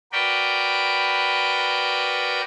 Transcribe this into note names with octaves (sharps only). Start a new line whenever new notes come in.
F#4 A#4 B4 D5 G5